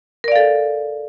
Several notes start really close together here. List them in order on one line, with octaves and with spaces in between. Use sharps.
A#4 D5 F5 A4